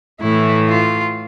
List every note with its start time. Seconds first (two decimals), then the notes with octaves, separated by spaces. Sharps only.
0.19 A2 E3 A3 E4
0.68 F4